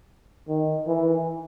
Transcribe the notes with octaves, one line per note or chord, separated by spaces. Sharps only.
D#3
E3